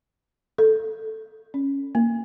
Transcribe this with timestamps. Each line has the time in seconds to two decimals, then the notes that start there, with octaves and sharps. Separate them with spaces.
0.58 A4
1.54 C#4
1.95 A#3